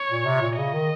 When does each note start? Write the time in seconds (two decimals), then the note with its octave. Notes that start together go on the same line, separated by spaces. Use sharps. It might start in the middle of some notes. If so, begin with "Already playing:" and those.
Already playing: C#5
0.10 A#2
0.26 C3
0.42 A#2
0.57 C#3 D#5
0.73 D#3